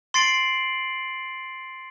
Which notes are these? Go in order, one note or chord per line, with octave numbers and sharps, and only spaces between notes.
C6 A6 C7 D7 F#7